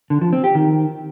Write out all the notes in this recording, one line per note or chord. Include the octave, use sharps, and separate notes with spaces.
D3
F3
C4
G4
D#3